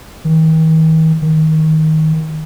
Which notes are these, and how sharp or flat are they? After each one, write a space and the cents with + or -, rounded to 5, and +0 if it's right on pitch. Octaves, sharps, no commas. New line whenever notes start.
D#3 +45
D#3 +15